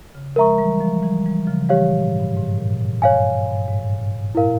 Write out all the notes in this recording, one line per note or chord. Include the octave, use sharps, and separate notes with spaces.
C#3
F3 G#3 A#4 E5 A#5 C#6
E3 G3
F3 G#3
E3 G3
E3 G3
C#3 F3
E3 G3 G4 C#5 F5
A#2
G#2
G2
G#2
A#2
G2 C#5 F5 G#5
G2
G#2
A#2 E4 A#4 F5